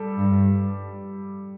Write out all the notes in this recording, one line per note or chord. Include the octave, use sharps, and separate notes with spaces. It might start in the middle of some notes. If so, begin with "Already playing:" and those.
Already playing: G3 A4
G2